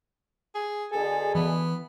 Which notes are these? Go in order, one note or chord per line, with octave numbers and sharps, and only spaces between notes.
G#4
B2 D3 G#4 A4
E3 B3